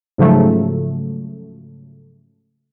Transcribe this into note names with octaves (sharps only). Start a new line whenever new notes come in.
G#2 C#3 F3 F#3 A3